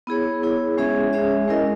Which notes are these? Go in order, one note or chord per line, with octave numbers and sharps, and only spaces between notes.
B3 E4 G#4 C#5
B3 E4 G#4 C#5
G#3 C#4 G#4 C#5 E5
G#3 C#4 G#4 C#5 E5
G#3 C#4 E4 A#4 D#5